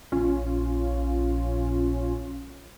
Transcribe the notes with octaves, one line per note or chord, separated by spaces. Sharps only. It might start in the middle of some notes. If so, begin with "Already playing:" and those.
A#1 C#4 F4